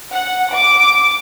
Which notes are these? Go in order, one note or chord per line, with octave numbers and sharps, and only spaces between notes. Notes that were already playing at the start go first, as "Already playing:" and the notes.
F#5
D6